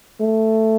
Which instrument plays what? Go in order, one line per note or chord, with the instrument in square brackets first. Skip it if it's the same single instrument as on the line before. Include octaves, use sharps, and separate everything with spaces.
[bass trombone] A3